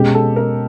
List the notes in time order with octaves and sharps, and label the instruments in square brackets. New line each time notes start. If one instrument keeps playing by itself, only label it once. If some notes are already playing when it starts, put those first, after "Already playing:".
Already playing: [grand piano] B2 G#3 C#4 [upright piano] G4
[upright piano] A4
A#4